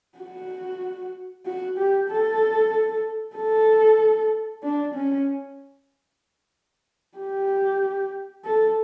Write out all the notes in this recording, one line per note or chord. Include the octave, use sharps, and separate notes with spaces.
F#4
F#4
G4
A4
A4
D4
C#4
G4
A4